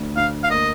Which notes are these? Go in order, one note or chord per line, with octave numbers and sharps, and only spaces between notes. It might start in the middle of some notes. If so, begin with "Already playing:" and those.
Already playing: D2
D2 F5
F5
A#3 D#5